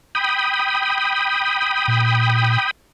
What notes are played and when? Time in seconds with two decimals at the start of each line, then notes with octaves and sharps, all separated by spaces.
0.15 G5 B5 D#6
1.88 A#2